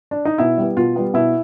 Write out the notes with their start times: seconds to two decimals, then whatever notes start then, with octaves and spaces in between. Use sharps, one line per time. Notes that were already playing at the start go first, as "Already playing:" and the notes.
0.11 D4
0.25 D#4
0.38 B2 E4
0.58 G3 B3
0.77 B2 F4
0.96 G3 B3
1.14 B2 E4